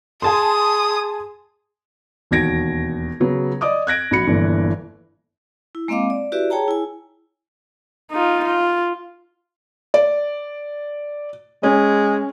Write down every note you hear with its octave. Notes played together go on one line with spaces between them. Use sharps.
G#4 G#5 A5 C6 D#6
E1 D#2 F#4 G#6 A#6 D7
C#3 F#3 B3
D5 D#5 D6 D#6
F#6 G#6 A#6 D7
A#1 F#4 B5 C#7
G1 A#2 E3
E4
G#3 A#3 C4 D#5 F5 D6
D5
E4 F#4 G4 B4 D5 E5
G#4 C#5 G5 A5 A#5
E4 G#5
D#4 F4
F4
D5
G#3 C#4